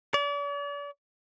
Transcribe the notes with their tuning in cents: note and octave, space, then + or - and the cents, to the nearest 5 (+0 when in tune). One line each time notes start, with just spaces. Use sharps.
D5 -40